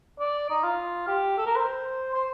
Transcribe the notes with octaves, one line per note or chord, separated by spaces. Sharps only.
D5
D#4
F4
G4
A4
A#4
C5
C5